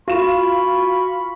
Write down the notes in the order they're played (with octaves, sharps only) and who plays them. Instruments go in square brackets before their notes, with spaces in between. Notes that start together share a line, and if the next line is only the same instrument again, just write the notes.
[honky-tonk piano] F4 E7 [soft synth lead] F#4 [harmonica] B5 C#6